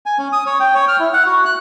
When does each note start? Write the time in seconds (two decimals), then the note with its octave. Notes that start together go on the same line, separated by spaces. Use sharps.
0.06 G#5
0.19 C#4
0.32 D#6
0.46 C#5
0.60 G5
0.75 C#5
0.88 F6
1.00 E4
1.13 F#5
1.26 F#4
1.45 F#6